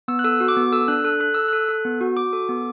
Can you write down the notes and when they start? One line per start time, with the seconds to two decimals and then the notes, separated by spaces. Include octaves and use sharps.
0.08 B3 E6
0.19 F#6
0.24 A4 E6
0.40 F#4
0.48 D6
0.57 B3
0.72 A4 E6
0.88 D4 F#6
1.04 A4 F#6
1.20 A4 F#6
1.34 A4 E6
1.48 A4 F#6
1.69 A4
1.85 B3
2.01 F#4
2.16 F#4 D6
2.33 A4
2.49 B3